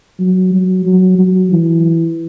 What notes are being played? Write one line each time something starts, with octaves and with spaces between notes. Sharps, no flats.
F#3
F#3
F#3
F#3
E3